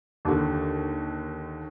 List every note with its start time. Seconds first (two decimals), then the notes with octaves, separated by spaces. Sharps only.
0.25 D#2 D3